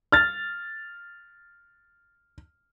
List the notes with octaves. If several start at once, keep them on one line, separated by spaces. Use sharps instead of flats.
F6 A6